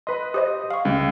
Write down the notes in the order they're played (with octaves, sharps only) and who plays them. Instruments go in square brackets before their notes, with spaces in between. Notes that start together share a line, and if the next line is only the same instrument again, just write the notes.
[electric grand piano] B4 D#5 [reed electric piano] B5 C6
[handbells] G4 C5 D#5 [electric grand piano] D#6
[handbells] F5 C#6
[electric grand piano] C#2 [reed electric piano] C#3 G3 C#4